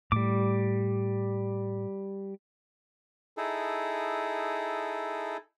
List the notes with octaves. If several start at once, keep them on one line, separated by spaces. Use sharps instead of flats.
A2 G3 D6
D#4 E4 G#4 A4